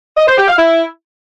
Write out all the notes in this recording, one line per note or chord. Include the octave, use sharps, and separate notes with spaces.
D#5
C5
G4
F5
E4